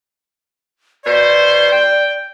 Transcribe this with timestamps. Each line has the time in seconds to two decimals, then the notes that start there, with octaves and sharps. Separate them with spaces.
1.05 B2 C5 D5
1.71 G5